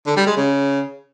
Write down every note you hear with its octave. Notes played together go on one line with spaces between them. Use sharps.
D3
G3
G#3
C#3